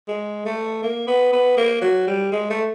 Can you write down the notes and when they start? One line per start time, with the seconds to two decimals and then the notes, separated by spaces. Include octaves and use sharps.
0.08 G#3
0.46 A3
0.83 A#3
1.07 B3
1.32 B3
1.57 A#3
1.81 F#3
2.07 G3
2.32 G#3
2.50 A3